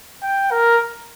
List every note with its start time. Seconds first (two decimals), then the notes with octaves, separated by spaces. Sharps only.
0.23 G5
0.51 A#4